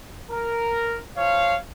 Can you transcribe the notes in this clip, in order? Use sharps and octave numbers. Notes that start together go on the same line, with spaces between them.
A#4
F3 C#5 F5